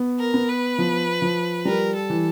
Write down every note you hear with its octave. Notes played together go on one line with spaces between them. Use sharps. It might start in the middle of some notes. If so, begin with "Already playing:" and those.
Already playing: B3
A#4
B3
B4
F3
F3
G3 A#4
A4
E3